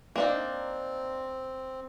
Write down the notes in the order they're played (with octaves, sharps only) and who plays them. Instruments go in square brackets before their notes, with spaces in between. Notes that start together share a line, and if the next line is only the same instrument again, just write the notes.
[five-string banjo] A#3 D4 D#4 [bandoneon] C4